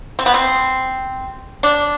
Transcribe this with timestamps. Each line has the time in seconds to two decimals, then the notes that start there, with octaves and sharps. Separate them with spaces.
0.19 C4
0.26 B3
0.34 C4
1.63 D4